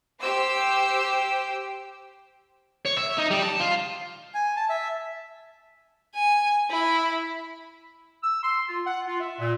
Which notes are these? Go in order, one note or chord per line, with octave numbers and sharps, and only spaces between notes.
G4 C5 E6
C#5
E5
D#4
G3
A5
F4
G#5
A5
E5
G#5
E4
E6
C6
F4
F#5
F4
E5
A#2